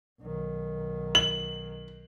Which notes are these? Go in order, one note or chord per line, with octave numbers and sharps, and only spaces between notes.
B1 D#3
F#7